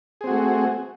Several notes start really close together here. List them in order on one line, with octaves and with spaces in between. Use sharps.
G#4 C4 F#4 A3